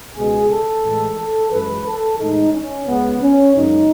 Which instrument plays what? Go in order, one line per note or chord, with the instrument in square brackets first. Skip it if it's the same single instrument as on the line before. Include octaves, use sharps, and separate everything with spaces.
[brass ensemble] C#2 B2 G#3 G#4
A4
A2 E3 G#3
A4
F#2 E3 G#3 B4
A4
A2 E3 G#3 D#4
C#4
C#2 C#3 G#3 B3
C#4
F#2 C#3 G#3 D#4